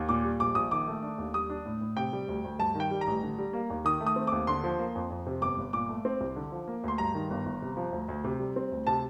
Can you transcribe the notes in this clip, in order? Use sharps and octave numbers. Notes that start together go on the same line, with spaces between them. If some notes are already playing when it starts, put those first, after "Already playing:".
Already playing: D#2
A#2 D6
G3
A#1 D6
A#1 D#6
D#3 D6
A3
D4
D#2
G3 D#6
D4
A2
A2
C3 G5
G3
D2
D2
G2 A5
D#3
G5
G3
A#5
A1
D3
G3
A#3
D#2
D#3 D#6
A3
D#6
C4
D#2 D6
D3 C6
F3
A#3
F2
F2
C3
G1 D6
G1
A#2 D6
A3
C4
C2
D3
F3
A#3
D2 C6
G2 A#5
D#3
G1
G1
C3
F3
D2
D2
C3
G3
C4
D2
C3 A5